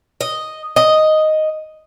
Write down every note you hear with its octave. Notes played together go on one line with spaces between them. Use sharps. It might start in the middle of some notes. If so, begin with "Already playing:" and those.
D#5
D#5